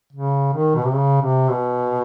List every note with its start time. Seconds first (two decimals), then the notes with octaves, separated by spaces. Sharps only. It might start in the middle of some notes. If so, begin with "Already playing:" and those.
0.13 C#3
0.53 D#3
0.75 B2
0.85 C3
0.94 C#3
1.22 C3
1.49 B2